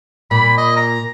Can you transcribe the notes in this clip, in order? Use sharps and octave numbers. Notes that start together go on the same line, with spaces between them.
A#2 B5
D#5
A#5